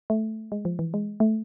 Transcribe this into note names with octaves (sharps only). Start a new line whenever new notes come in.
A3
G#3
F3
E3
G#3
A3